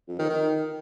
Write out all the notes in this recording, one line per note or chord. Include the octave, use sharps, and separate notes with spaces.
F2
D#3
D#3